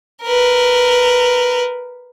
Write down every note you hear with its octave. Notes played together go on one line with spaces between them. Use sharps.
A#4 B4